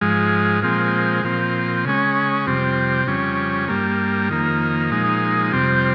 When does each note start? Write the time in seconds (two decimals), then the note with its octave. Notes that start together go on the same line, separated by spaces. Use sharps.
0.01 G#2 F3 G#3
0.62 A#2 F3 G#3 C4
1.24 A#2 F3 C4
1.85 C#3 G#3 C#4
2.46 F2 C3 G3 C4
3.07 F2 C#3 G3 C#4
3.68 G2 G3 A#3
4.30 F2 D#3 A#3
4.90 A#2 F3 G#3 D#4
5.52 F2 C3 G3 C4